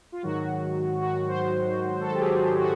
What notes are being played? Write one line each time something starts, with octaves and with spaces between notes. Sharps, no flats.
F4
G#2 D#3 F#3 F#4
F#4
C5
A4
G4
G#4
G4
F#4